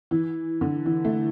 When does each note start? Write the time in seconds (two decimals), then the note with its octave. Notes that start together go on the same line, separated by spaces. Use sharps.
0.11 E3
0.61 D3
0.86 E3
1.05 A3